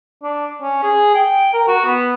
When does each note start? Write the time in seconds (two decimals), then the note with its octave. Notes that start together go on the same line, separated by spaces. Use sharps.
0.23 D4
0.62 C#4
0.83 G#4
1.14 G5
1.53 A#4
1.68 F#4
1.85 B3